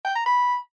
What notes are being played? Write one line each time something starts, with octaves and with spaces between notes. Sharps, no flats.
G5
A#5
B5